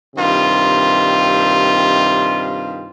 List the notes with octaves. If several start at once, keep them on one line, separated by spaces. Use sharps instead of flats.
G2 C3 D#3 F4